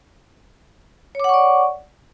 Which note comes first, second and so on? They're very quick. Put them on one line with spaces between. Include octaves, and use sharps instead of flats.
C#5 D6 F#5 C#6 D5